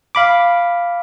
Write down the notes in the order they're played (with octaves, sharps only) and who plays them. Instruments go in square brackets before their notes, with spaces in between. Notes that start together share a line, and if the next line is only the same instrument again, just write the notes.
[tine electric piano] F5 B5 D6